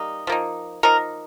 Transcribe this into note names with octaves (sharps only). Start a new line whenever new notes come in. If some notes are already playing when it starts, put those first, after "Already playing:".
Already playing: G3 A#3 D#4
F3 A#3 D#4
F3 A#3 D#4 A#4